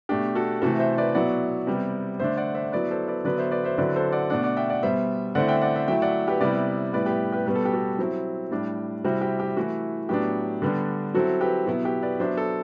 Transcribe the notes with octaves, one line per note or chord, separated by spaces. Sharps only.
B2 A3 D4 G4
F#4 A4
C3 E3 A3 F#4 A4
C5 E5
B4 D5
B2 F#3 B3 E4 D5 F#5
C3 G3 B3
D3 A3 D4 C5 E5
D5 F#5
C5 E5
F#3 B3 E4 B4 D5
A4 C5
B4 D5
D3 F#3 B3 B4 D5
C5 E5
B4 D5
C5 E5
D3 F#3 C4 E4 B4 D5
A4 C5
D5 F#5
B2 A3 D4 D5 F#5
D5 F#5
E5 G5
D5 F#5
B2 G3 B3 C5 E5
D3 A3 C4 E4 D5 F#5
E5 G5
D5 F#5
C5 E5
F#3 A3 E4 E5 G5
D5 F#5
G4 B4
C3 G3 B3 E4 B4 D5
A2 G3 B3 E4 B4 D5
G4 B4
G4 B4
B2 G3 B3 B4
A4
G4
F#4 A4
F#3 C4 E4
A2 G3 D4
C3 G3 C4 E4 F#4
G4
G4
E3 A3 E4 F#4
A2 F#3 B3 D4 G4
D3 G3 B3 D4
F#3 C4 E4 F#4 A4
G4 B4
B2 F#3 B3 E4
G4 B4
B4 D5
F#3 B3 D4 C5 E5
A4 C5